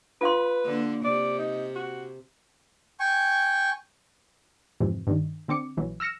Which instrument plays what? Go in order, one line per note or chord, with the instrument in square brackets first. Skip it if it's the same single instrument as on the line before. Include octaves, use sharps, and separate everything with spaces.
[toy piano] F4 F5 C6 [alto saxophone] B4
[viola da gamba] D3 A#3
[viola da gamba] C3 [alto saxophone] D5
[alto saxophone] D#4
F#4
[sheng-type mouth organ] G5 G#5 C#6
[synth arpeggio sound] F2 G#2 C3 E3 F3
G2 D#3
D3 C4 D6 C#7
A#1 E3 F#3
E6 F6 A#6 C#7 E7